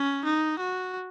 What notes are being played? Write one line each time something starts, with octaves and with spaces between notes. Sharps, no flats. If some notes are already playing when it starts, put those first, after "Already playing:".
Already playing: C#4
D#4
F#4